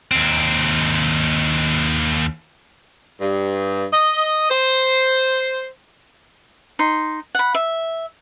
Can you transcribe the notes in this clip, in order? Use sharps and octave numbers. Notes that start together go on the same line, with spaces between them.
D#2 C4
G2
D#5
C5
D#4 C6
F#5 B5
E5